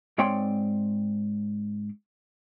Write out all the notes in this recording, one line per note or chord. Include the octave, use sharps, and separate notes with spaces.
G#2 C4 C#5 D5 G5 C6